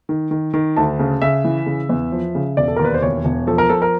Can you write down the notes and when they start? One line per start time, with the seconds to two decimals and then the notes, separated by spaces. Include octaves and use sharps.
0.09 D#3
0.31 D#3
0.54 D#3
0.77 D2 A5
0.99 C#3
1.22 C#3 E5
1.44 E3
1.66 C#3
1.89 E2
2.12 F3
2.35 C#3
2.57 E1 D5
2.68 A4
2.76 D#2 A#4
2.85 B4
2.94 C5
3.02 E1 C#5
3.25 E1
3.47 F3 A4
3.58 A#4
3.70 F3 A4
3.82 A#4